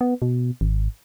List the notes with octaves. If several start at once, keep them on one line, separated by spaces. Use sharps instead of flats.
B3
B2
G#1